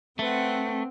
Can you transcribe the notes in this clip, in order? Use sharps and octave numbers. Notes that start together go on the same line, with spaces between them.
A3 C4 B4 F#5